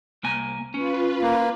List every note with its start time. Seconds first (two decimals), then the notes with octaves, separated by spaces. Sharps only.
0.23 C2 A#3 G#5
0.74 C#4 F4 B4
1.22 A#3